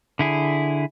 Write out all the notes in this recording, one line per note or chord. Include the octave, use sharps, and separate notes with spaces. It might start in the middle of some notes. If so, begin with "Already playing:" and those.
D3 E4 G#4